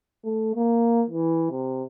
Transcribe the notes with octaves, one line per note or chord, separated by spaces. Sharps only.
A3
A#3
E3
C3